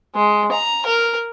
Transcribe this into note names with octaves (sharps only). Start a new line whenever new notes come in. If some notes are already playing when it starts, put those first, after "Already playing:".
G#3
A#5
A#4